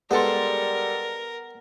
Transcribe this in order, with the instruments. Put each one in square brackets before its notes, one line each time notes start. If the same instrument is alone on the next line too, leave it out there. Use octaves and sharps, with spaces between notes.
[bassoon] G3 [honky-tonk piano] G#3 A4 C6 [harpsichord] B3 [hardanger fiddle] A#4